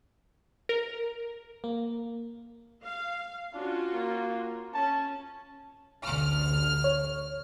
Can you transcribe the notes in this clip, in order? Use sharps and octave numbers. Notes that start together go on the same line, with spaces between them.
A#4
A#3
F5
C#4 D4 F4 F#4
A#3
C#4 A5
A1 D2 D3 F6
C#5